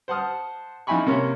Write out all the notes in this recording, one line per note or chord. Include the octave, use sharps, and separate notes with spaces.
C5 F#5 A5 D#6 F6
F2 D#4 E4 G#5 B5 C#6
C3 A#3 C#4